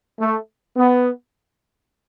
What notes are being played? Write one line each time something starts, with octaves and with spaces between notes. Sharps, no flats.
A3
B3